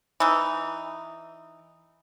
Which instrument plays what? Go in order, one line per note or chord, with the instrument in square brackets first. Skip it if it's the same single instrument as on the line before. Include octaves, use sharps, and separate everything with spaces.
[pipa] E3 D#4